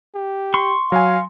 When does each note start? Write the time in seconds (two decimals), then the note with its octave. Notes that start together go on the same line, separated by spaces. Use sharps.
0.16 G4
0.54 C6 C#6
0.92 F#3 F5 G#5